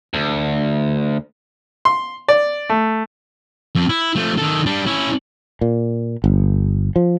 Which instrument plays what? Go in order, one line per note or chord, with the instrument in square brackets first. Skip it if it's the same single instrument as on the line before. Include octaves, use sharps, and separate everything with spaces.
[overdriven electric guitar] D2
[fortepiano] C6
D5
A3
[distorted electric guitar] F2
E4
F3 A3
D#3 A4
G3 D4
C#4 E4
[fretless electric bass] A#2
G1
F3